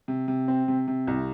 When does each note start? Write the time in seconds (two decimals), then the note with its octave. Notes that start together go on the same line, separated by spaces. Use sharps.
0.08 C3
0.28 C3
0.48 C4
0.68 C3
0.88 C3
1.07 C2